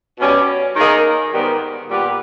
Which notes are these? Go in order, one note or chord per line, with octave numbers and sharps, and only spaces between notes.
B2 G3 C#4
D#3 A#3 D#4 G#4 D#5
G#2 D#3 G3 B3 G4
A#2 G3 B3 G4 B4